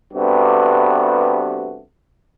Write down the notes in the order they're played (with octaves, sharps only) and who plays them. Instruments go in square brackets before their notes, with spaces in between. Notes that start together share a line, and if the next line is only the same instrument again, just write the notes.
[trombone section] G2 C3 A3 B3 F#4